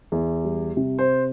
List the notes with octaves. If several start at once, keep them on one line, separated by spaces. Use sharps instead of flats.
E2
G3
C3
C5